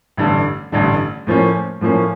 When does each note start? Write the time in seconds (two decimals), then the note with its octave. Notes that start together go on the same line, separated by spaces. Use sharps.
0.17 A1 G2 D3
0.72 A1 G2 D3
1.27 A2 F3 A#3 C#4
1.81 A2 F3 A#3 C#4